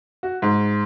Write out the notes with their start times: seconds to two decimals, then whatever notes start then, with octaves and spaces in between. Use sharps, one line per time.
0.23 F#4
0.42 G#2